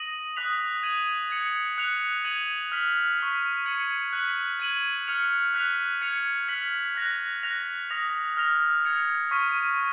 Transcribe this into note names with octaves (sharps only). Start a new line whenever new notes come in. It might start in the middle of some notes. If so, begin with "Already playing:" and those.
Already playing: D#6 A#6 D#7 F#7
D#6 F#6 B6 F7
G#6 D#7 F#7
G#6 C#7 F#7
F#6 C#7 F7
G#6 D#7 F#7
F6 B6 F#7
C#6 F6 B6
G#6 C#7 F#7
F#6 B6 F#7
G#6 D#7 F#7
F6 G#6 C#7 F7
F#6 B6 F7
G#6 C#7 F7
F6 B6 F#7
F#6 A#6 F7
F#6 A#6 F7
D#6 A#6 F7
F6 A#6 F7
G#6 C#7 F7
C#6 F6 B6 D#7